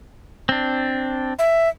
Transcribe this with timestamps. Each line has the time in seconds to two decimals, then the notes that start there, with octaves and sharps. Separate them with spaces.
0.49 C4 D4
1.39 E5